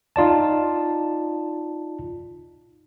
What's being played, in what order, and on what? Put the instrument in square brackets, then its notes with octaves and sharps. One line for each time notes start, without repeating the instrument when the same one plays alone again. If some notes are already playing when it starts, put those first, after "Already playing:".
[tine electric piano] D#4 F4 D5 A5